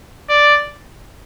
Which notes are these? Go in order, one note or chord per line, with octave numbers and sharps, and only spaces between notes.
D5